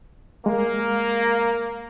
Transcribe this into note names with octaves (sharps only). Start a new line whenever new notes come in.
G#3 A#3